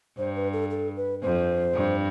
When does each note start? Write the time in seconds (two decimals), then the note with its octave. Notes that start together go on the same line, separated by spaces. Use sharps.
0.18 G2 C5
0.36 B4
0.53 A4
0.71 A4
0.97 B4
1.22 F2 C5
1.75 G2